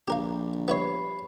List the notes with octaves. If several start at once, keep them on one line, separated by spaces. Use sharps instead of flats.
A#1 G4 A#4 F5
B3 E4 G4 C#5 B5 C7